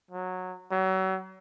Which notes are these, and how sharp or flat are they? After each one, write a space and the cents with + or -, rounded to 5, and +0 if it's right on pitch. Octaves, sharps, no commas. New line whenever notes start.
F#3 -10
F#3 +35